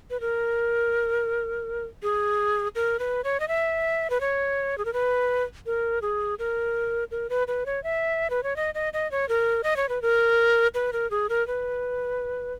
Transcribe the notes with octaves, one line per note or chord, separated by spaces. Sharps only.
B4
A#4
G#4
A#4
B4
C#5
D#5
E5
B4
C#5
G#4
A#4
B4
A#4
G#4
A#4
A#4
B4
B4
C#5
E5
B4
C#5
D#5
D#5
D#5
C#5
A#4
D#5
C#5
B4
A#4
B4
A#4
G#4
A#4
B4